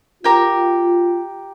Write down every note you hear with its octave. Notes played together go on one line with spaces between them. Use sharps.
F4 G4 A#4 G5